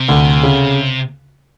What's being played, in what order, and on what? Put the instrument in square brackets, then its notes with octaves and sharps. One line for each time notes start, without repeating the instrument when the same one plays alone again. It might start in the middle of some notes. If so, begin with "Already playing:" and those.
Already playing: [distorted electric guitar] C3
[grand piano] D2
C#3